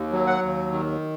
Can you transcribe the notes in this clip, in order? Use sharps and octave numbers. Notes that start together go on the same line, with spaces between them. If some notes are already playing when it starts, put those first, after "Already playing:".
Already playing: D#2
F#3
F#5
D#2
D#3